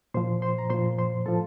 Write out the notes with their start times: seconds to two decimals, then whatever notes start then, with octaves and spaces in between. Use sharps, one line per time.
0.14 A#2 F3 C5 C6
0.42 C5 C6
0.58 A#5
0.70 A#2 F3 C5 C6
0.98 C5 C6
1.26 A2 F3 A4 A5